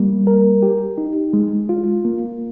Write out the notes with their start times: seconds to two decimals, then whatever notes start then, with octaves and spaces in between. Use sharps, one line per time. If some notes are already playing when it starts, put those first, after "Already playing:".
Already playing: G3 A#3
0.27 A#4
0.63 G4
0.98 D#4
1.33 G#3
1.69 F4
2.05 A#3